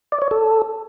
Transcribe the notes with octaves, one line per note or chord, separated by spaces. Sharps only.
D5
C#5
A4